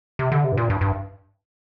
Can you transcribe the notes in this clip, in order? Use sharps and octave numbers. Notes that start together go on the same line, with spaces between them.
C3
D3
C3
G2
A#2
G2
G2